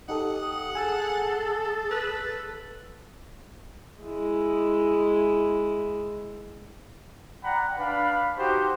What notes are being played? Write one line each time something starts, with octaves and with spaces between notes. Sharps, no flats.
D#4 G4 A4 F#5 D#6
G#4 A4 G#5 E6
B4 E6 F#6 A6
G#3 E4
D5 F#5 G5 A#5 B5
D4 B4 F5 B5
D#4 F#4 G4 C5